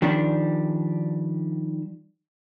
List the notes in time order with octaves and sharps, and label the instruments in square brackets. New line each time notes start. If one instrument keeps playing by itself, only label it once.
[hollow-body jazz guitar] D#3 F3 G3 D4